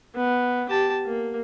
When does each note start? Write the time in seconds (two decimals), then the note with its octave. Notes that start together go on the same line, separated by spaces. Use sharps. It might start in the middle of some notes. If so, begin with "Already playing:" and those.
0.15 B3
0.69 G4 A5
1.05 A#3